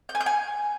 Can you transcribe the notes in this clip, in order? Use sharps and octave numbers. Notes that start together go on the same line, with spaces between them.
G6
G#5
G6
G#5